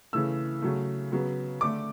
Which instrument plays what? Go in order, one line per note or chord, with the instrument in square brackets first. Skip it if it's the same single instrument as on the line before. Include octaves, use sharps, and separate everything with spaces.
[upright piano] C#3 E3 A3 E6
C#3 F#3 A3
C#3 F#3 B3
D3 A3 D6